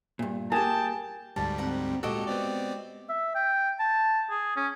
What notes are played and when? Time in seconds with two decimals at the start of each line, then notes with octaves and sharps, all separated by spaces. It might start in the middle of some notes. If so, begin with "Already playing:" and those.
0.19 G2 A#2
0.52 A#3 G4 G#4 G5 A5
1.36 D2 G#2 G3 A5
1.58 C4 F#5 A#5
2.03 A#2 G#3 F#4 G4 A4 D#5
2.27 B3 C4 D5
3.09 E5
3.35 G5
3.80 A5
4.30 G#4
4.56 C#4